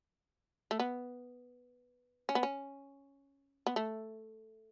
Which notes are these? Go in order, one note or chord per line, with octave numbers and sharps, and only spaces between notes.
A3
B3
C#4
B3
C#4
B3
A3